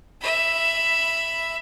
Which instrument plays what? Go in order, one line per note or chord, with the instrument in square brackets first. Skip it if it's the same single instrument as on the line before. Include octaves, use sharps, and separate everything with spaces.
[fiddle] E5 B5